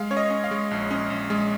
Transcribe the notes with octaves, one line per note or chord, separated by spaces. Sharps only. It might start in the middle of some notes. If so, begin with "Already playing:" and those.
Already playing: G#3 F5
C#4 C#5
D#5
C#4
F5
G#3
A#1
C#4
A#1
G#3